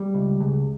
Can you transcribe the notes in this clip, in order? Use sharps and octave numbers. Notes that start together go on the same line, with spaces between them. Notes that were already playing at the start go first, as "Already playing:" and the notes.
Already playing: G3
C#2
C#2